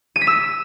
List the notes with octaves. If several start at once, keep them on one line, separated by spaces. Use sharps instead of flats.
D#7
B6
E6